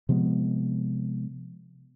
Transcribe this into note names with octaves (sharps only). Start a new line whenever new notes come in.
C3 F3 G#3 B3